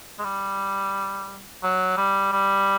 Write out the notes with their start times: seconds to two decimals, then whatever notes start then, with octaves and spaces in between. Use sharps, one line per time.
0.19 G#3
0.24 G3
1.63 F#3
1.97 G3
2.32 G3